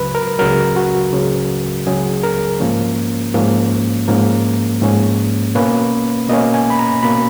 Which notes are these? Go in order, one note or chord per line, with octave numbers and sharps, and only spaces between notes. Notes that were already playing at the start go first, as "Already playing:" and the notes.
Already playing: C#2 C#3 F#3 B4
A#4
C#2 C#3 F#3 A#4
F#4
C#2 C#3 F#3
C#2 C#3 F#3 G#4
A#4
G#2 F3 A#3 C#4
G#2 F3 A#3 C#4
G#2 F3 A#3 C#4 A#4
G#2 F3 A#3 C#4
B2 A#3 C#4 B4
B2 A#3 C#4 D#5
G#5
B5
A#5
B2 A#3 C#4 B5